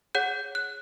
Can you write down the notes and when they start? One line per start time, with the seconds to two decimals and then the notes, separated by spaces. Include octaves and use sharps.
0.15 G#4 C#5 F#5 G6
0.55 F#6